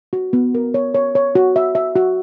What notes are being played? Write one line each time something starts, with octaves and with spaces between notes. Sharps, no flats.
F#4
B3
A#4
C#5
C#5
C#5
F#4
E5
E5
F#4